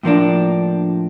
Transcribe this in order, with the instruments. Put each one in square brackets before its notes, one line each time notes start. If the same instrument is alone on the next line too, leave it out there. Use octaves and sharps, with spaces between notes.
[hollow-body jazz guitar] A2 F3 A#3 D4